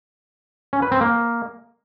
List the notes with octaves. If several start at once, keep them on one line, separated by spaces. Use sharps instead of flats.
C#4
B4
C4
A#3